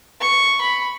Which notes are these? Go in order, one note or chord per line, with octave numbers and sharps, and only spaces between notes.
C#6
B5